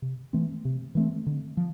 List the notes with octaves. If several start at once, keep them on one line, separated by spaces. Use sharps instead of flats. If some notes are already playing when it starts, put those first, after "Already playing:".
C3
E3 A3 C4
C3
E3 A3 C4
D3
F3